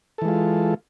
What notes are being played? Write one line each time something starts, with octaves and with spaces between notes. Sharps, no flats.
E3 G#3 F4 A4